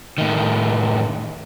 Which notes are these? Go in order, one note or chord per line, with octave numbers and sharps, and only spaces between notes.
A2 D#3